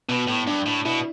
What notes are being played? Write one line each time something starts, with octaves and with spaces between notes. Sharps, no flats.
B2 B3
A2
G2 D4
A2
B2 E4